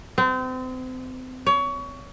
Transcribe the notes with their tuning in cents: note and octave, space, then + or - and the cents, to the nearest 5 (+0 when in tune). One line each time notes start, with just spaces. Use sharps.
C4 -35
C#5 +25